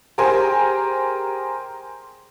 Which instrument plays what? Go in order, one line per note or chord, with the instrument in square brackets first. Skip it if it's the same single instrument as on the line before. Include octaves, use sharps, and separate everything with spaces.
[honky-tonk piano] G4 G#4 A#4 C5 G#5